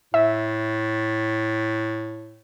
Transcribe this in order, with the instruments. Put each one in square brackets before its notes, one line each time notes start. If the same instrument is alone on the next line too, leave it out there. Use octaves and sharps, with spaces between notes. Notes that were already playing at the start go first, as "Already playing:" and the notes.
[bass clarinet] A2 [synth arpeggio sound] E5